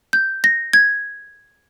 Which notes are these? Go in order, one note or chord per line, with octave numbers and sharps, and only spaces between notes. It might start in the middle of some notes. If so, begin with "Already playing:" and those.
G6
A#6
G#6